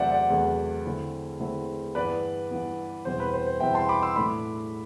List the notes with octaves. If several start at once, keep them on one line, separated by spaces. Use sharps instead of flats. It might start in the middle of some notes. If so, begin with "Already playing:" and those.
Already playing: E2 C3 F#3 A3 C5 D5 E5 F#5
D5 F#5
E2 C3 F#3 A3
D3 A3 C4 E4
D3 A3 C4 E4
G2 E3 B3 B4 D5
G2 E3 B3
E2 B2 G3 C4 E4 C5
B4
C5
C5
E2 B2 G3 C4 E4 E5 G5
A5 C6
B5 D6
C6 E6
A2 E3 A3 D4 B5 D6